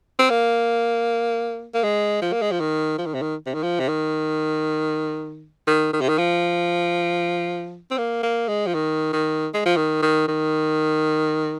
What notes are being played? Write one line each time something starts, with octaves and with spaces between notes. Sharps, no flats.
C4
A#3
A#3
G#3
F3
A#3
G#3
F3
D#3
F3
D#3
C3
D#3
C3
D#3
F3
C3
D#3
D#3
D#3
C3
D#3
F3
C4
A#3
A#3
G#3
F3
D#3
D#3
G#3
F3
D#3
D#3
D#3